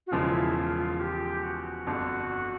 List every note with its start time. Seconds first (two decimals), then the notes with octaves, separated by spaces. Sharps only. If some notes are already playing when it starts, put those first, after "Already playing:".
0.07 F#4
0.11 E1 E2 C#3 F3 G#3 F4
0.33 E4
0.55 F4
0.77 F4
1.00 G4
1.43 F#4
1.87 G1 F2 D3